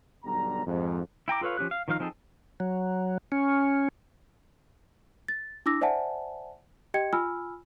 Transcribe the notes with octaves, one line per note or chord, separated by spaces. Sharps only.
B1 B2 D3 G3 A#5
F2 G#2
E4 G5 A#5 D6
F4 A4 B4 C#5 F5
F3 C#4 G4 F#6
F5
D#3 F3 D#4 F5 F6
F3 C4 D#4 G#4 A4
F#3
C#4
A6
D4 E4 D6 E6 A#6
C5 D5 E5 F#5 G#5 A5
G4 D#5 G5 G#6 C#7
F4 G#5 B5 E6 F6